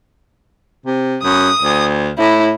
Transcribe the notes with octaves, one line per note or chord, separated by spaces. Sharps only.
C3
F#2 D#6
D2
A2 E4